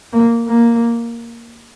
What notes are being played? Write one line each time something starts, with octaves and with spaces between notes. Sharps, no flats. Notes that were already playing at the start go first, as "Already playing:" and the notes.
A#3
A#3